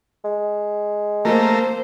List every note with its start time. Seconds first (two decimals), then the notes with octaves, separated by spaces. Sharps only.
0.25 G#3
1.25 A3 A#3 A#4 C5